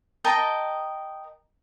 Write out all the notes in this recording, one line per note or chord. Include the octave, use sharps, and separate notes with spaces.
A#4 D#5 G5 A5